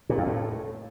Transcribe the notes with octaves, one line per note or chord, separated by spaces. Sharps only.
A#2
F2
A2